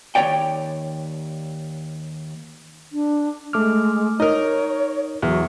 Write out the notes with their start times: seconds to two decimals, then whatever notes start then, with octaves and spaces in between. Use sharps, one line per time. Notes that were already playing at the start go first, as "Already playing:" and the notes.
0.15 D#2 F3 C#5 D5 G5
2.92 D4
3.53 G#3 A3 D6 F6
4.20 D#4 A#4 C#5 D#5
5.22 E2 F#3